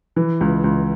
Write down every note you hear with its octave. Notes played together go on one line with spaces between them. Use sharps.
E3
C#2
C#2